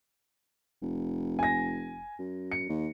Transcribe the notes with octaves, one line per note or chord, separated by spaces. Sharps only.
F1
G#5 A#6
F#2
C#7
D#2